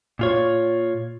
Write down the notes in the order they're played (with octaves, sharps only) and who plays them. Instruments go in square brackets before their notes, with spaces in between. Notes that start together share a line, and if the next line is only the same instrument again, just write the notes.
[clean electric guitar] A#2 F4 C#5